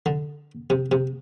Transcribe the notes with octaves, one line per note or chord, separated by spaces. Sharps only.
D3
C3
C3